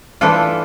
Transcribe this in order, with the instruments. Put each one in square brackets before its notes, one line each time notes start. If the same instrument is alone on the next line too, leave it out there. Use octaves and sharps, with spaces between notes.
[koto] E3 A3 D4 F4 A4